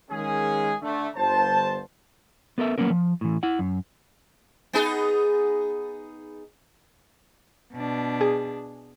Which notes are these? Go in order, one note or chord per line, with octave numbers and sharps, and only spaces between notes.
D#3 G#3 A#3 C#4 G#4
D3 A3
G1 C5 A5
B3 A4 A#4 E5
F#3 A#3 B3 C#4 A#4
F3
A2 E3
E4 F#5
F#2
B3 D#4 G#4
B2 D4
G#4